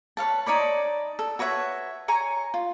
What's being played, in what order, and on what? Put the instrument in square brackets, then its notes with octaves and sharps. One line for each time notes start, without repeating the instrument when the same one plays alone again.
[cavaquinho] B4 C#5 F5 A5
D#4 C#5 D5 B5
A4
F#4 B4 C#5 E5
C#5 G#5 A#5 C#6
F4